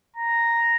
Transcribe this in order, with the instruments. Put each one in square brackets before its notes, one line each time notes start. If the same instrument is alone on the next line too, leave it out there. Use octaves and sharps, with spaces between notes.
[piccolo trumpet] A#5